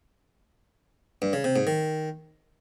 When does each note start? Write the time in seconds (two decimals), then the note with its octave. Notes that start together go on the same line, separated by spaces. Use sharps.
1.22 G2
1.33 C#3
1.44 C3
1.56 G#2
1.67 D#3